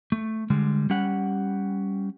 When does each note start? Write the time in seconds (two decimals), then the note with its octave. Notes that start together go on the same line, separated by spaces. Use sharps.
0.12 A3
0.50 D3 G3 G#3
0.90 G3 C#4 G4 F#5